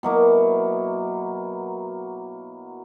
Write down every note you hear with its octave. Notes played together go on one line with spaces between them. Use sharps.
B2 F#3 A#3 E4